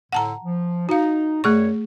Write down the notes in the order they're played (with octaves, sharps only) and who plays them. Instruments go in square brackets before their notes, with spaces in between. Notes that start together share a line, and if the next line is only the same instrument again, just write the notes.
[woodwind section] A2 D3 [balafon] F#5 A5 A#5
[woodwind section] F3
[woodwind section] D#4 [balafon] F#4 F5
[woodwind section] F#2 G3 C#5 [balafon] A3 G#4 C#6